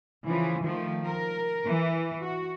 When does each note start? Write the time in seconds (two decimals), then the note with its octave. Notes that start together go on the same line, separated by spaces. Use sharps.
0.25 C#3 E3 F3
0.62 D#3 F3 A3
1.06 A#4
1.68 E3
2.22 F#4